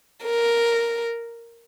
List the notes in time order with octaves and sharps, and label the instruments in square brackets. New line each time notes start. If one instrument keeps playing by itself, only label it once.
[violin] A#4